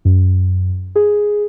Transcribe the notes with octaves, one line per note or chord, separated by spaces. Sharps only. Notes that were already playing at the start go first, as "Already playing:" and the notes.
F#2
G#4